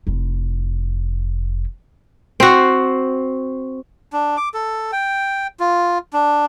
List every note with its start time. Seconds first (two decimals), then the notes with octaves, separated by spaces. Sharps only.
0.07 F1 E4
2.40 C4 F#4
4.13 D4
4.37 D6
4.54 A4
4.92 G5
5.60 F4
6.13 D4